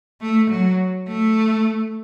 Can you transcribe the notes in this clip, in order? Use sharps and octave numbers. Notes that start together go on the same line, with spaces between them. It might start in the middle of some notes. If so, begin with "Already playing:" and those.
A3
F#3
A3